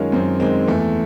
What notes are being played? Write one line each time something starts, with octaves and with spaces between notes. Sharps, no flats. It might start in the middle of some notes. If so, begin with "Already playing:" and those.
Already playing: F#2 D#3 G#3 C#4 F4
F#2 C4
D#3 G#3 C4
E2 A3